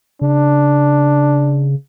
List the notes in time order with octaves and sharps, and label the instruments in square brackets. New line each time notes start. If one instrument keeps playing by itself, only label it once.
[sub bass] C#3 [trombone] D4